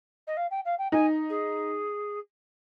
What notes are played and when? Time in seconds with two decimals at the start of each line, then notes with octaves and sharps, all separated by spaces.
0.27 D#5
0.37 F5
0.50 G5
0.65 F5
0.78 G5
0.92 D#4 G#5
1.29 G#4